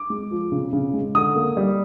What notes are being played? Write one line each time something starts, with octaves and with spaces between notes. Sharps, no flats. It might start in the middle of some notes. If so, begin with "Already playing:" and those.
Already playing: D6
G#3
F3
C#3
C#3
G#3
D3 D#6
A#3
G3